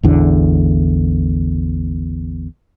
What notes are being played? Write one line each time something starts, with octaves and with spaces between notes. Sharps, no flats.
A1 E2 D3